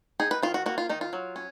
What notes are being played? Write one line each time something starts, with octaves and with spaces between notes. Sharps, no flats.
D#4 G#4
B4
D#3 F4
F#4
A#3 F#4
F4
D#3 D#4
F4
F#3
C#4